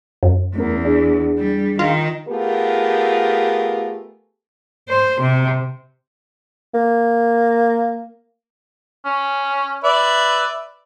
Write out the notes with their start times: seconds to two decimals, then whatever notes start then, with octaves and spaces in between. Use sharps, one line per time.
0.23 F#2
0.56 E2 A3 C#4 A#4
0.85 D4 G#4 D5
1.39 G3
1.79 D#3 F4
2.28 A3 B3 F4 G4 G#4 A#4
4.89 C5
5.21 C3
6.74 A#3
9.05 C#4
9.84 B4 D5 E5